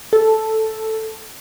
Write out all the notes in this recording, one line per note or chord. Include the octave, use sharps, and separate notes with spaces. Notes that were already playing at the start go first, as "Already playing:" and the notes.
A4